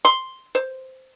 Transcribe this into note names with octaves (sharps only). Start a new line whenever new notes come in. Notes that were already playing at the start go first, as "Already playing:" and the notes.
C6
C5